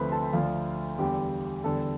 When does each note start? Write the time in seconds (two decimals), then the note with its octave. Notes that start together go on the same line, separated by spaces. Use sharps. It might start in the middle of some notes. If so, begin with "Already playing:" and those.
Already playing: D2 C3 F3 A3 B4 C5 B5 C6
0.12 A4 A5
0.33 D2 D3 F3 A3 F4 F5
0.98 E2 D3 G3 G4 G5
1.64 E2 D3 G3 A4 A5